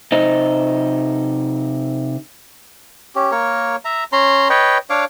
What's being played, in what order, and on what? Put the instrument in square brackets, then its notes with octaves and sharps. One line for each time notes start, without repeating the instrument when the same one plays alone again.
[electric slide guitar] C3 D#4 C5 D#5
[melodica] C#4 G4
A#3 A#4 C#5
E5 A#5
C#4 A#5 C6
B4 C#5 D#5 G5
D4 C#5 F5 D6